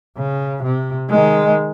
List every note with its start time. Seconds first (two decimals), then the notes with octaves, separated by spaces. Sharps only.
0.17 C#3
0.64 C3
1.09 D#3 G#3